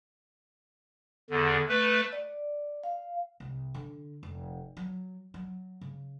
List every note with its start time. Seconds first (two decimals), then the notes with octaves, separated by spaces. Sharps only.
1.30 E2 D3
1.68 A3 B4
2.13 D5
2.84 F5
3.40 C2
3.74 D3
4.23 F1
4.77 F#3
5.34 F#3
5.81 C#3